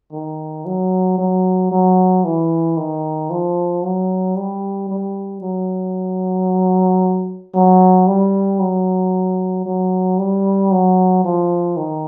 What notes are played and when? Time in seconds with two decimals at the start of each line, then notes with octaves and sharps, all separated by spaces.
0.12 D#3
0.66 F#3
1.18 F#3
1.71 F#3
2.24 E3
2.77 D#3
3.30 F3
3.83 F#3
4.36 G3
4.89 G3
5.42 F#3
7.54 F#3
8.07 G3
8.60 F#3
9.66 F#3
10.19 G3
10.71 F#3
11.25 F3
11.77 D#3